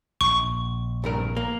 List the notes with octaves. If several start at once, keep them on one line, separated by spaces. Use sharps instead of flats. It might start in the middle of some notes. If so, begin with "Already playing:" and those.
A#1 C#6
C2 G2 A#4
A#3